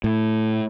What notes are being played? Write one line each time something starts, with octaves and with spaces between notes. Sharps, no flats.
A2